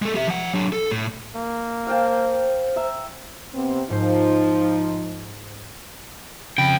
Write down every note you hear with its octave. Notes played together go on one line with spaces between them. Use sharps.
G#3 A4
G4 E5
F3 F#5
F#3 D4
A4
A2
A#3
C5 F5 G5 A5
E5 A#5
C3 B3 C4
G#2 F3 D#4 C5
F2 C#3 G5 B5